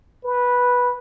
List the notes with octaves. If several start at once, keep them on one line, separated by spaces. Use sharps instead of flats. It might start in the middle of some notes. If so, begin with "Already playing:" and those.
B4